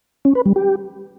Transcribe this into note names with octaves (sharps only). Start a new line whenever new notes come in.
C#4
B4
G3
G4